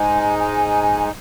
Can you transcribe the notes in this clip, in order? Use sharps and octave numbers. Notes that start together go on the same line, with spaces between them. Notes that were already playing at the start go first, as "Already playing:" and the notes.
Already playing: G#2 G#3 D#4 G#5
G#5